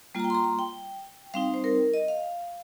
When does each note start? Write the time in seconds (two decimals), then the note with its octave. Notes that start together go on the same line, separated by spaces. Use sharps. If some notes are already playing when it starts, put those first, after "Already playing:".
0.15 G3 A#3 F4 A#5
0.24 G5
0.30 C6
0.35 A#5
0.44 C6
0.59 G5
1.34 G3 C4 D#4 F5
1.54 C5
1.64 A#4
1.94 D#5
2.08 F5